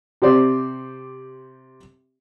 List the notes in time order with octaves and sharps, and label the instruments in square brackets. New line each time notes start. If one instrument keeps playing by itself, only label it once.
[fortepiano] C3 G4 C5 D5